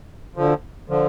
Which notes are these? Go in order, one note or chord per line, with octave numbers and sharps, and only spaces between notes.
D2 D3 F3
D3 F3